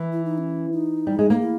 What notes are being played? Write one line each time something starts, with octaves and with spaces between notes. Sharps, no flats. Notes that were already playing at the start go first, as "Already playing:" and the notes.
Already playing: E3
E4
D#4
C#4
D#4
G3
G#3
A#3
E4